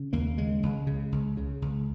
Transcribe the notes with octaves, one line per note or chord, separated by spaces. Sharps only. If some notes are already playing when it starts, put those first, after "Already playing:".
Already playing: C#3
D#2 A#3
C#3 G#3
C#2
C#3
C#2
C#3
C#2